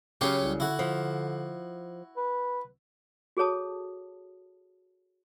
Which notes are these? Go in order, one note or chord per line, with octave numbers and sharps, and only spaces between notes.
C#3 F#3 C#4 G4 C#5
C2
D3 E4 F#4
F3
B4
F#4 G#4 A4 C#5 A5 D#6